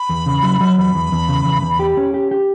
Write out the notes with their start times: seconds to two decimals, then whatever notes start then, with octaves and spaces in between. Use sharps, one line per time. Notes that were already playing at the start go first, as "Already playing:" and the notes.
Already playing: B5
0.09 E2
0.26 C#3
0.43 F#3
0.60 F#3
0.78 E2 B5
0.95 E2
1.12 E2
1.29 C#3
1.46 E2
1.62 E2
1.79 G4
1.97 C#4
2.14 G4
2.31 G4